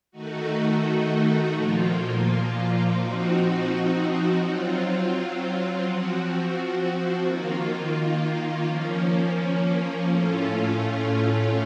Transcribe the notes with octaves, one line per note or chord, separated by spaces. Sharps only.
D#3 A3 D#4 F#4
A#2 F3 A#3 F4
F3 C4 D#4 F#4
F#3 C4 F4
F3 C4 F#4
D#3 A#3 F4
F3 A#3 C#4
A2 A3 C#4 F4